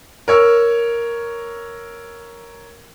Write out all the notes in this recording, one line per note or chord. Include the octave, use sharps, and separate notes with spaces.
A#4 C#5 E6